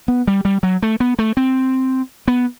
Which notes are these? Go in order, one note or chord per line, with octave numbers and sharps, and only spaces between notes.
B3
G3
G3
F#3
A3
B3
A3
C4
B3